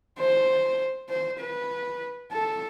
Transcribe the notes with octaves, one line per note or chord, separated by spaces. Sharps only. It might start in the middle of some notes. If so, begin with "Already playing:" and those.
C5
C5
B4
A4